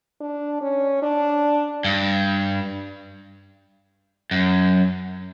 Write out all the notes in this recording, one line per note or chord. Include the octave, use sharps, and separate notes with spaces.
D4
C#4
D4
G2
F#2